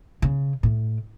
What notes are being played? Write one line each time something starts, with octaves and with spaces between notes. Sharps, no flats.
C#3
A2